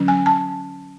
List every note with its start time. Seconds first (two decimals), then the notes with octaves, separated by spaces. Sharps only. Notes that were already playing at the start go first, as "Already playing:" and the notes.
Already playing: D3 F#3 C#4
0.08 G#5
0.26 A5